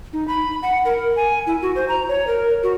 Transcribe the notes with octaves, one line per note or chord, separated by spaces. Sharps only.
D#4
B5
F#5
A#4
G#5
E4
F#4
C5
A#5
C#5
A#4
F#4